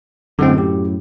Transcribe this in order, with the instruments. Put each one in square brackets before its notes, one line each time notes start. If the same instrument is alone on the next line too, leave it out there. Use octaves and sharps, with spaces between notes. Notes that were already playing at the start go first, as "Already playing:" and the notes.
[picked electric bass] F#2 A2 [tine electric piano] D3 G#3 C4
[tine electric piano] G4